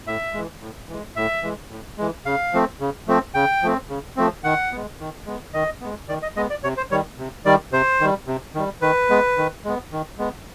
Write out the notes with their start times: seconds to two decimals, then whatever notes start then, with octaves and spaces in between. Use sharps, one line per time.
0.07 A2 E5
0.33 E3 G#3
0.61 A2
0.89 E3 G#3
1.16 A2 E5
1.43 E3 G#3
1.71 A2
1.98 E3 G#3
2.25 C#3 F5
2.53 F3 A3 C4
2.80 C#3
3.08 F3 A3 C4
3.34 C#3 G5
3.63 F3 A3 C4
3.89 C#3
4.16 F3 A3 C4
4.44 D#3 F#5
4.72 G#3 B3
5.00 D#3
5.26 G#3 B3
5.54 D#3 D#5
5.81 G#3 B3
6.09 D#3 D5
6.23 D#5
6.36 G#3 B3 D#5
6.50 D5
6.63 C3 C#5
6.77 C5
6.91 D#3 G3 C#5
7.19 C3
7.45 D#3 G3 D5
7.72 C3 C5
8.01 D#3 G3
8.27 C3
8.55 D#3 G3
8.82 D#3 B4
9.10 G#3 B3
9.38 D#3
9.65 G#3 B3
9.92 D#3
10.18 G#3 B3